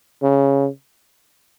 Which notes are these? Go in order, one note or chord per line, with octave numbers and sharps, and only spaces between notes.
C#3